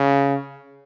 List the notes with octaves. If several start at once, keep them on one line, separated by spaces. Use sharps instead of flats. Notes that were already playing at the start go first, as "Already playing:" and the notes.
Already playing: C#3